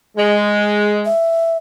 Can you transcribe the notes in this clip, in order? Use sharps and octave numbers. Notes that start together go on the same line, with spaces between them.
G#3
E5